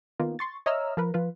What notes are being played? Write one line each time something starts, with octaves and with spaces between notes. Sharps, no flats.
D#3 A#3 B3 F4
C6 C#6 A6
C#5 D#5 E5 A#5 E6 F6
F3 A#4 B4
F3 F4 B4